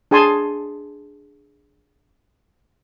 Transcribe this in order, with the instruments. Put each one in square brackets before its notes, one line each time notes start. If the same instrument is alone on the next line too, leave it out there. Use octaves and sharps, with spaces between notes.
[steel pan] D4 G#4 G#5 A5 C6